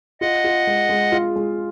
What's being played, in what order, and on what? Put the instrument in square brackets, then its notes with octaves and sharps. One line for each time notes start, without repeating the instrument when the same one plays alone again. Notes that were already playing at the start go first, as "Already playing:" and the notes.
[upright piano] F4 [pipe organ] D#5 F#5
[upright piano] F4
G#3
G#3
F4
G#3